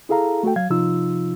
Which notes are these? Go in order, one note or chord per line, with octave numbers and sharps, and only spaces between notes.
E4 G#4 A4 F5 A#5
A3 F#4 A4 G5
F#3 F5 G#6
C3 F3 D#4 F4 E6